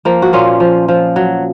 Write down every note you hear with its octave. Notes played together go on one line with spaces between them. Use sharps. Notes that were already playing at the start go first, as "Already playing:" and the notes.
F3 A#3
F#4
A#2 C#4 F4
F3
F3
F#3